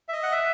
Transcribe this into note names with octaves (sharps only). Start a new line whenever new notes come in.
E5
D#5
F#5
E5